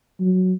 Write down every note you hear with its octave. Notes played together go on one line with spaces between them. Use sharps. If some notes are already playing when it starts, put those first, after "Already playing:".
F#3